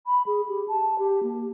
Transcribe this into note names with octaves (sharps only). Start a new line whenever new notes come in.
B5
G#4
G4
A5
G4
A#3